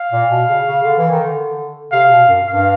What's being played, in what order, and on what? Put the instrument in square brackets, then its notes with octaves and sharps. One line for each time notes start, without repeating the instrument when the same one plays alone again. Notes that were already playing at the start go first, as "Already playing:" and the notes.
Already playing: [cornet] F5
[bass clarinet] A#2
B2
C#3
C#3
D3
E3
D#3
D3
[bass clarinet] C3 [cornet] F5
[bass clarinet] B2
F#2
[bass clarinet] G2 [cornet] F5